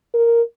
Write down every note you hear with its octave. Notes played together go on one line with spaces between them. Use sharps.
A#4